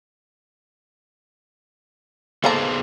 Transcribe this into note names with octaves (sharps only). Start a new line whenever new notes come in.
A#3 B3 G#4 A4 C5 A#5